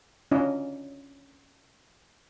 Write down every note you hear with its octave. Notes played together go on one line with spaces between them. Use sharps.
C#4 D4 F4 D#5